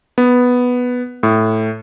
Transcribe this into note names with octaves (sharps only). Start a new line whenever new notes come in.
B3
A2